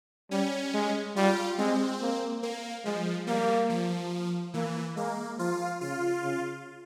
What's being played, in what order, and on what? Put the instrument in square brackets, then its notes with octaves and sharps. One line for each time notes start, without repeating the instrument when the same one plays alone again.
[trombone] G3 [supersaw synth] C#4
[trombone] G#3
[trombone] G3 [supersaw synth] F4
[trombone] G#3 [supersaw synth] C4
[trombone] A#3
[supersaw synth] A#3
[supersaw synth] F3 [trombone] G#3
[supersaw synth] G3 [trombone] A#3
[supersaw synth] F3
[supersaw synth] E3 [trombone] A#3
[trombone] G#3 [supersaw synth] A#3
[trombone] F3 [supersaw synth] F4
[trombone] C#3 [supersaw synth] F4
[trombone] C#3